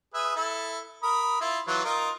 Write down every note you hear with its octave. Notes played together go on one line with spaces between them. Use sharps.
G#4 B4 E5
E4 A4
A#4 B5 D#6
E4 F4
E3 F#3 F4
D#4 F4 A#4